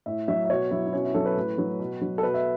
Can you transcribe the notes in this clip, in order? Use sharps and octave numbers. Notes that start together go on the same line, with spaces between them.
A2 E5
F#3 E5
E5
B2 C#5
F#3 E4
E4
B2 C#4
E4
F#3 A4
B4
A2
F#3
B2
F#3
A4
B2 B4
E5